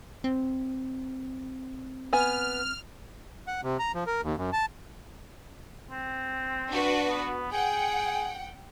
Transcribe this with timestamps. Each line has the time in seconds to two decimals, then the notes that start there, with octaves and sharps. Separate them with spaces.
0.24 C4
2.13 B3 G#5 F6
3.47 F#5
3.63 C3
3.79 A#5
3.95 F3
4.07 A#4
4.23 D#2
4.37 F#2
4.53 A5
5.91 C4
6.70 D4 F#4 B4
7.08 B3
7.52 G#4 F#5 G5